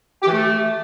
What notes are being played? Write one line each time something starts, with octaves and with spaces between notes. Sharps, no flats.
G4
E3
A3